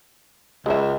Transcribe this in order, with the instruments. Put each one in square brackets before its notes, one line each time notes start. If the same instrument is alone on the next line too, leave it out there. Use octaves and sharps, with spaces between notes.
[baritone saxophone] C#2 [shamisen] G#3 E5